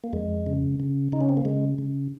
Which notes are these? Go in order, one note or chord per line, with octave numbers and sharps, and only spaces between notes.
A#3
F2 G#3
C#3
C#3
C#3 D#4
C#4
C4
A#3
C#3 G#3
C#3